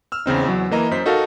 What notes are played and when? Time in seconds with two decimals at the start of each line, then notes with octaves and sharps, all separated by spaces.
0.12 E6 F6
0.26 E2 C#3 C4 D#4
0.45 E2 F#3
0.71 E3 A#3 D#5 A#5
0.91 F#2 C5 B6
1.06 D#4 F#4 A4 A#4 F5 A5